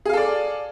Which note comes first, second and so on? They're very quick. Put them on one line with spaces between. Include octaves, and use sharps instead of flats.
G#4 F5 A4 D5